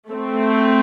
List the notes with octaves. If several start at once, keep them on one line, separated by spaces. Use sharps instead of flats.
A3 C4